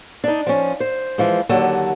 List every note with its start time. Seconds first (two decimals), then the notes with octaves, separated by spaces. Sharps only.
0.24 D4 D#4
0.47 F3 C#4
0.80 C5
1.18 E3 F3 G#3
1.49 D#2 D3 F#3 A4